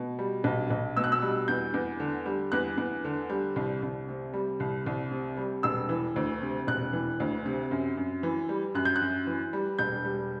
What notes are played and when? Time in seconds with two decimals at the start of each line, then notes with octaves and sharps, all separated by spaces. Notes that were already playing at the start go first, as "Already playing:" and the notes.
Already playing: B2
0.19 G3
0.44 B1
0.70 B1
0.97 B2 E6
1.04 F#6
1.12 E6
1.22 G3
1.48 E2 G6
1.74 E2
2.00 D3
2.26 G3
2.52 E2 F#6
2.78 E2
3.05 D3
3.30 G3
3.56 C2
3.82 C2
4.08 C3
4.34 G3
4.60 C2
4.86 C2
5.12 C3
5.37 G3
5.63 E1 E6
5.89 E3
6.16 D2
6.42 C3
6.67 E1 F#6
6.93 E3
7.20 D2
7.46 C3
7.71 F#2
7.97 F#2
8.23 E3
8.49 G3
8.74 F#2 F#6
8.85 G6
8.96 F#6
9.01 F#2
9.27 E3
9.53 G3
9.79 E1 G6
10.05 G3